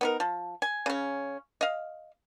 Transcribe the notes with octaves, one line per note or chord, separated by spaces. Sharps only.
B3 D#4 A#4
F3
G#5
C#3 C#4
D#5 F5